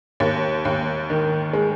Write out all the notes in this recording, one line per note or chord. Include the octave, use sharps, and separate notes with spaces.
D#2
D#2
D#3
G#3